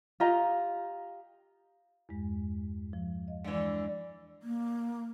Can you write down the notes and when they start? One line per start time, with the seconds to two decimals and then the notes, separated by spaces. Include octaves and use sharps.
0.20 F4 G4 D#5 A#5
2.09 E2 G2 G#3
2.93 F3
3.28 D#5 F5
3.44 D3 E3 G#3
4.43 A#3